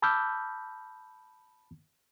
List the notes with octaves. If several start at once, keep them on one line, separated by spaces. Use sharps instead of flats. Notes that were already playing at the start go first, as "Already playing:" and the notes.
A5 B5 D6 E6 F6 G6